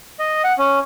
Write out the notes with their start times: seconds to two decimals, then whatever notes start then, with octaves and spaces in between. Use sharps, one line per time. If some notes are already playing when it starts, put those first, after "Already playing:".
0.19 D#5
0.44 F#5
0.58 C#4